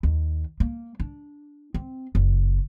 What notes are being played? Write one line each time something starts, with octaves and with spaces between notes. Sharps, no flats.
D#2
A#3
D4
C4
F#1